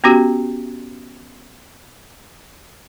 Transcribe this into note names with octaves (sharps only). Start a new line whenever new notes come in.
B3 C#4 F#4 G4